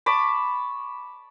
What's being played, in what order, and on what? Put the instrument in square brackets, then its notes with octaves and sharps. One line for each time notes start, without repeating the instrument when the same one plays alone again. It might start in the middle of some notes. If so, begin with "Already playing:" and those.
[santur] A5 B5 C#6 D6